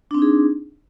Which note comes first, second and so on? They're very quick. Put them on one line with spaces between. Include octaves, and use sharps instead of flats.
D4 C4 D#4 G#4